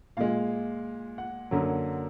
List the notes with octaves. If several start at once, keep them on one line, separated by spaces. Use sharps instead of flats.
A#2 G#3 F5
F#5
F#2 D3 F#3 A#3